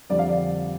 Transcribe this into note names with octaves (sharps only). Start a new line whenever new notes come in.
F2 D3 G3 D5
F5
D5